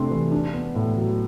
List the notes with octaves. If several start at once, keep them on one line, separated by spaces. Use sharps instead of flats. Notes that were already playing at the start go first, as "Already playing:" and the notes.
Already playing: C3 A3 D4 C6
E3
D4
B3
A2
F#3